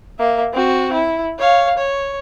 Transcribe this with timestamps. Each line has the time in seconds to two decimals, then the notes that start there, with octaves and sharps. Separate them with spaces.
0.19 A#3 E5
0.53 C4 F#4
0.93 E4
1.39 C#5 F5
1.77 C#5